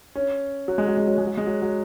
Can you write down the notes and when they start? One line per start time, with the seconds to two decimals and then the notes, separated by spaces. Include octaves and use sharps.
0.15 C#4
0.68 F#3
0.78 G#3
0.88 F#3
0.97 G#3
1.07 F#3
1.18 G#3
1.27 F#3
1.37 G#3
1.47 F#3
1.62 F#3